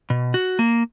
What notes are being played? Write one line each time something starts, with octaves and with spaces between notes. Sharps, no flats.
B2
F#4
A#3